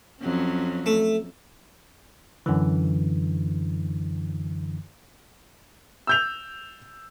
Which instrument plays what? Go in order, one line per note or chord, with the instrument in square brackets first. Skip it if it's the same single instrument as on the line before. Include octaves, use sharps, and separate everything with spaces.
[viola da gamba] F2 F#3 C#4
[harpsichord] A3
[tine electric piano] F#2 D3 E3
[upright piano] E6 G6 F7